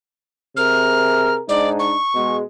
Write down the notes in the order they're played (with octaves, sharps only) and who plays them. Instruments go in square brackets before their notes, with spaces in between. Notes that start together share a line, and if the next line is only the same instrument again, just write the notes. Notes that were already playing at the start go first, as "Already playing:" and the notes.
[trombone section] C3 G#4 A#4 [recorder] F6
[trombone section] G#2 D4 D#4 [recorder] D5
[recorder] C#6
[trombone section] B2 G#3